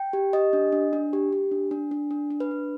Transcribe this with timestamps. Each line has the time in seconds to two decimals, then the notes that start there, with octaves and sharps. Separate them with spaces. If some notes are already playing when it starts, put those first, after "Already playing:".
Already playing: G5
0.13 G4
0.33 G4 D#5
0.53 D4
0.72 D4
0.93 D4
1.13 G4
1.32 G4
1.51 D4
1.71 D4
1.91 D4
2.11 D4
2.31 D4
2.40 B4
2.51 D4